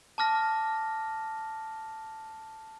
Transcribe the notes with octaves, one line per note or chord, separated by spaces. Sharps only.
A5 D6 F6 A#6